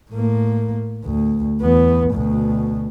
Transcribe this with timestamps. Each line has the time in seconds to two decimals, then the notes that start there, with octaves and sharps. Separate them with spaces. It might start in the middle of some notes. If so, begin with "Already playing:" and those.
0.11 A2 A#3
1.04 D2
1.61 E2 B3
2.11 D2 B2